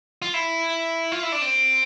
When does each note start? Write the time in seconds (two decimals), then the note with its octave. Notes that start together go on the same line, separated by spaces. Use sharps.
0.22 F4
0.34 E4
1.12 F4
1.23 E4
1.32 D4
1.42 C4